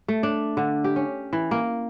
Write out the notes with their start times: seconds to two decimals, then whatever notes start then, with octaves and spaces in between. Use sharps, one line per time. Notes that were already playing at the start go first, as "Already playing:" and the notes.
0.08 A3
0.23 D4
0.57 D3
0.84 G4
0.96 C#4
1.33 E3
1.51 A#3